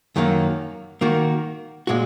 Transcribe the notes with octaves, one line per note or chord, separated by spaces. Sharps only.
F#2 D#3 F#3 A#3
D#3 A#3 F#4
A#2 G#3 F#4